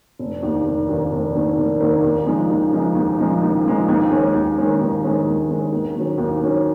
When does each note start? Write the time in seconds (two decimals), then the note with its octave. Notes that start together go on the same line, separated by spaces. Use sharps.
0.19 F1
0.42 D#2 D#3 A#3
0.66 F1
0.89 D#2 D#3 A#3
1.12 F1
1.35 D#2 D#3 A#3
1.58 F1
1.80 D#2 D#3 A#3
2.04 D#2
2.26 C#3 F3 G#3 D#4
2.50 D#2
2.73 C#3 F3 G#3 D#4
2.95 D#2
3.18 C#3 F3 G#3 D#4
3.42 D#2
3.65 C#3 F3 G#3 D#4
3.88 D#2
4.11 D#3 G#3 C#4
4.34 D#2
4.57 D#3 G#3 C#4
4.80 D#2
5.03 D#3 G#3 C#4
5.26 D#2
5.49 D#3 G#3 C#4
5.72 D#2
5.96 D#3 F#3 C#4
6.18 D#2
6.41 D#3 F#3 C#4